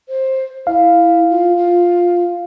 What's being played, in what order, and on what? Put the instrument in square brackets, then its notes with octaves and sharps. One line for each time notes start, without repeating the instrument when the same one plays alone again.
[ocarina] C5
[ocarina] E4 [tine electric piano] F5
[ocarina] F4
F4